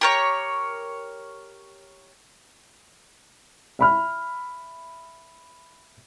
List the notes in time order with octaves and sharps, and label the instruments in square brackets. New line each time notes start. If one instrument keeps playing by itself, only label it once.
[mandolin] G4 A#4 C#5
[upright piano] E5 B5 F6